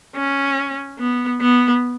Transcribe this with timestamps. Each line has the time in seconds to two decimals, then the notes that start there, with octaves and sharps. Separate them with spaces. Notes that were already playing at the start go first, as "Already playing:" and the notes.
0.16 C#4
0.99 B3
1.41 B3